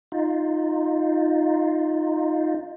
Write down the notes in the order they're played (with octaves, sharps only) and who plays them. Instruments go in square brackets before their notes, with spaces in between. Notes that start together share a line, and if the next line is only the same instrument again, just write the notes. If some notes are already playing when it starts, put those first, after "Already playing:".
[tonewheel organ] D#4 F4